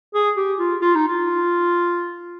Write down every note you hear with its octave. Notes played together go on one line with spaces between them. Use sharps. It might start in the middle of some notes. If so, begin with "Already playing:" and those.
G#4
G4
F4
F4
D#4
F4